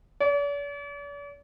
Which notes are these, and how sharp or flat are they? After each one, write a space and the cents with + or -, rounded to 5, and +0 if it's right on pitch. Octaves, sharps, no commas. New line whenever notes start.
D5 -45